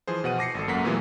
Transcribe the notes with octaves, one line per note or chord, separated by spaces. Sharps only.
E3 F3 G#4 C5
B2 F#5 D#7
D6 A#6 C7 C#7
G#1 A4
F#2 A#3 A4 F#5 B6
A#2 E3 F#3 A3 B3 G#4